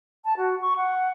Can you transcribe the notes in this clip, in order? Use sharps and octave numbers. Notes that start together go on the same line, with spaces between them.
A5
F#4
C#6
F#5